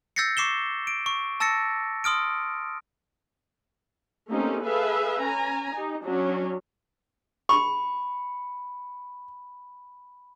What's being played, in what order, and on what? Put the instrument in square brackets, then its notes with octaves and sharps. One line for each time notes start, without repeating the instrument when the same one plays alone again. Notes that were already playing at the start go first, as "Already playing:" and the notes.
[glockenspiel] E6 G6 A6 A#6 C7 C#7
C#6 D6 C7 E7 G7
D7
C#6
A5 E6 A6 A#6 C#7
C6 D#6 F6 D7
[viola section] A3 A#3 C4 C#4 D#4 G4
G#4 A4 B4 E5 F5
C#4 G#5 A#5
D#4 G4
F#3 C#4 D4
[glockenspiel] B5 [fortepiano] C#6